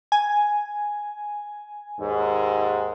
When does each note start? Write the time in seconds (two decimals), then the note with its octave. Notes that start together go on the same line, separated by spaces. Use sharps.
0.12 G#5
2.00 D#2 G#2